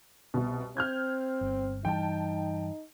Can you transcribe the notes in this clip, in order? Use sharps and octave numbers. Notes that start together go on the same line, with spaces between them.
C2 B2
C4 F6 G6 G#6
G1
G2 E3 G3 D#4 G5 A5